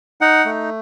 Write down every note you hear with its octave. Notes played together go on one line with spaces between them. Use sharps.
D#4 F#5
A3